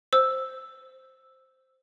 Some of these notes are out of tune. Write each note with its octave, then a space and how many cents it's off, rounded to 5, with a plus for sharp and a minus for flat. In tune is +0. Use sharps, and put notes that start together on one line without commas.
C5 +0 E6 +0